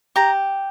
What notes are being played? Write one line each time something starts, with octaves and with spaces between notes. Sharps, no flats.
G4 A#5